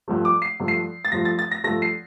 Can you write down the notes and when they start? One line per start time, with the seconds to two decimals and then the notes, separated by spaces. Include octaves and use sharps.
0.08 G2 F3 A3
0.25 D6
0.42 C7
0.60 G2 F3 A3
0.68 C7
1.05 A6
1.12 G2 F3 A3 A#6
1.25 A6
1.39 A6
1.51 A#6
1.64 G2 F3 A3 A#6
1.82 C7